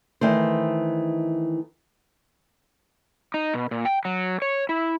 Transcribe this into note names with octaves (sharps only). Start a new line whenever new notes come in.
D#3 E3 A3 C5
D#4
B2
A#2
G5
F#3
C#5
E4